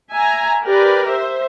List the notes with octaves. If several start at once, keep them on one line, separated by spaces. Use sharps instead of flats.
E5 G#5 A#5
G4 A#4 B4 D5
C5 E5